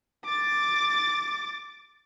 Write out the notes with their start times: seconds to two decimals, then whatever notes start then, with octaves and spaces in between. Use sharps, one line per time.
0.25 D6 A6